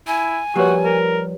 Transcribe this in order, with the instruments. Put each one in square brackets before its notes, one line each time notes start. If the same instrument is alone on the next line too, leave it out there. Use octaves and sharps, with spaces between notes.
[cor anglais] E4 [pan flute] G#5
[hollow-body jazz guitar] F3 G3 A#3 [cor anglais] F#4 [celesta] G4 B4 C#5
[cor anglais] A#4